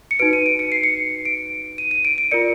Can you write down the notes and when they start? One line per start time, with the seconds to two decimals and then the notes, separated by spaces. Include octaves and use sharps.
0.11 C#7
0.19 D#4 F#4 B4 D7
0.33 D#7
0.46 D7
0.59 C#7
0.72 C7
0.84 C#7
1.25 D7
1.78 D#7
1.91 D#7
2.05 D7
2.18 D7
2.31 F4 A#4 D5 C#7